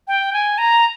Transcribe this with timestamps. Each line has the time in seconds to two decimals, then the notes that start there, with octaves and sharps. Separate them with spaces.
0.08 G5
0.33 G#5
0.58 A#5